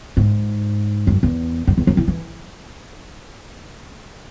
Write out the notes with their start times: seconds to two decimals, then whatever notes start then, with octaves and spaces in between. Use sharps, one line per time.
0.17 G#2
1.07 F#2
1.23 E2
1.67 F#2
1.78 E2
1.87 F#2
1.97 E3
2.08 E3